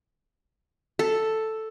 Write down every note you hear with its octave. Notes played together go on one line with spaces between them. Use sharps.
A4